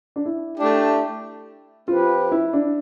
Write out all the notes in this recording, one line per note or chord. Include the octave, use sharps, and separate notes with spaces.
D4
E4
A3 D4 G4
F3 C4 F4 G4 B4
E4
D4